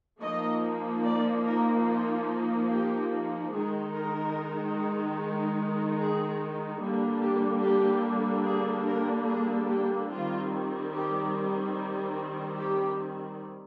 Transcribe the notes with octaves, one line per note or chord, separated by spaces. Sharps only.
F3 A#3 D#4 D#5
D5
A#4
F4
G4
D#3 G#3 D#4 G#4
A#4
G#4
D3 G3 A#3 D4
G4
G4
G#4
A#4
G#4
G4
D#3 G3 C4 F4
G4
G4